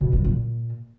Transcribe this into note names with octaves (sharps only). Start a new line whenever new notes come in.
B2
G3
A#2